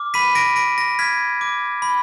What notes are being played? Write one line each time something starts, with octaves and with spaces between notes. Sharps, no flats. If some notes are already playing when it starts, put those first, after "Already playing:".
Already playing: D6 F6
B5 B6 D#7
A#6 D7
B5 A#6 D7
A#6
F6 G#6 B6
D6
B5